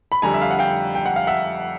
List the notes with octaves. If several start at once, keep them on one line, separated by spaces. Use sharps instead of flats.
B5
F2 D3 G3 G#5 A#5
E5
F5
F#5
F5 G5
G5
F#5
F5
E5 F#5